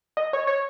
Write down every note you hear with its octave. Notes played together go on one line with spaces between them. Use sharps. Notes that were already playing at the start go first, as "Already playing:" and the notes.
D#5
C#5
C#5